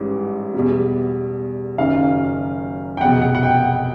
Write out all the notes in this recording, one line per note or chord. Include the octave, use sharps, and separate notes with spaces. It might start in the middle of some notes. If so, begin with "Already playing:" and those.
Already playing: A1 G#2 E3 G3
E2 B2 G3
F#1 F#2 D#3 F5
G5
F1 E2 B2 F#5
F#5
F#5
G5